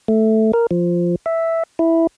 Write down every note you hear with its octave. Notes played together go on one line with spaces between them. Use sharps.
A3
A#4
F3
E5
E4